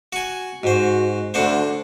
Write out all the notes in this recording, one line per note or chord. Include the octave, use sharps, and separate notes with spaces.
F#4 G#5
G#2 F#4 C5
D2 D3 D4 F#4 C5